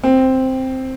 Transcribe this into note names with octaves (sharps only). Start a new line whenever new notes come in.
C4